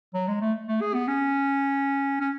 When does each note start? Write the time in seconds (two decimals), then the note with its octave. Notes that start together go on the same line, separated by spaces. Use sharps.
0.14 F#3
0.28 G#3
0.41 A3
0.68 A3
0.81 G#4
0.94 B3
1.08 C#4
2.21 C#4